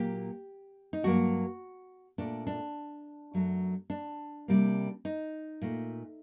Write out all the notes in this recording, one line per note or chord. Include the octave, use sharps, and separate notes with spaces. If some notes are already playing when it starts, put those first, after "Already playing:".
Already playing: A#2 F#3 A#3 G4
D#4
G2 F#3 A#3 F#4
A#2 A3 D4
D4
F#2 F#3 A3
D4
C3 G3 A#3
D#4
A#2 A3